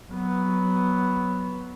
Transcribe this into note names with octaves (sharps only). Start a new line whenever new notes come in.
F#3 B3